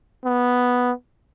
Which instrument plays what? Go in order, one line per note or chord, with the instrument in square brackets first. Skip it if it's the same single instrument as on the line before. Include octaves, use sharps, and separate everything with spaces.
[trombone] B3